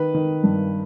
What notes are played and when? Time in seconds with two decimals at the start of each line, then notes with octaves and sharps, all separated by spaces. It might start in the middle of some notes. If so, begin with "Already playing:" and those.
Already playing: D#3 B4
0.14 D#3
0.43 G2